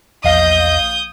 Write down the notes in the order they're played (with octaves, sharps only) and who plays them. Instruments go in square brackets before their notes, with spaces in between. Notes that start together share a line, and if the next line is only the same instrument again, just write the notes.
[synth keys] A#1 F5 [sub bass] E2 [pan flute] D#5 [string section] D#6 G6